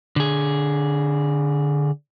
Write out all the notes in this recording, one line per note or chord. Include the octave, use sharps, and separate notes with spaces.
D3 G#4